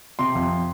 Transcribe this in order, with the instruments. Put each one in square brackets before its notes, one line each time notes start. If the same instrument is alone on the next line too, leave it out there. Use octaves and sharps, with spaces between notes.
[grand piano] C3 C6
F2